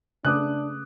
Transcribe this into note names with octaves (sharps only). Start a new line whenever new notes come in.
C#3 A3 D4 B4 D6 D#6 F#6